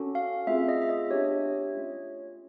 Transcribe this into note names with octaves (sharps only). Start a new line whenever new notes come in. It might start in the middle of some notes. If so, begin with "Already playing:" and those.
Already playing: C#4 F#4 A4
F5
A3 C4 F4 G#4 E5
D#5
E5
D#5
B3 D4 G4 C#5
A3 C#4 F4